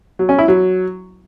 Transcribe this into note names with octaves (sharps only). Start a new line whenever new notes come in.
F#3
C#4
E4
F#3